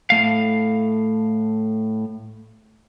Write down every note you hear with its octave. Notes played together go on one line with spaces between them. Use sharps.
A2 A3 F5